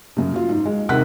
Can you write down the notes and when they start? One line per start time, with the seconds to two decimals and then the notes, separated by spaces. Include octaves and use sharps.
0.17 F#2 C#3
0.34 F#3 F4
0.49 G#2
0.65 G#3
0.89 D#2 C3 A#4 F#5 F#6 B6